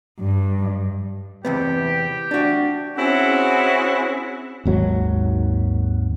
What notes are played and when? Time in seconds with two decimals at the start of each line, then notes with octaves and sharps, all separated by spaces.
0.20 G2
1.45 E2 C3 B3 G4
2.31 D4 F#4
2.98 C4 C#4 E4 F#4 G#4
4.65 G#1 D#2 F#3